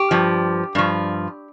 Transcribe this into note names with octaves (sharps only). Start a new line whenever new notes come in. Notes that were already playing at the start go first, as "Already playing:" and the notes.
Already playing: G4
G2 F3
G2 F3